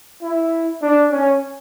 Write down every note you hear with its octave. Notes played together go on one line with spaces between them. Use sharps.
E4
D4
C#4